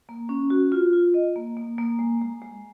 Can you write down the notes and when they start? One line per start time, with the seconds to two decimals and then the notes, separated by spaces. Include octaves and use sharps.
0.09 A#3
0.29 C#4
0.50 F#4
0.72 F4
0.93 F4
1.14 D#5
1.36 A#3
1.57 A#3
1.78 A#3
1.99 G#3
2.21 G#3
2.42 G#3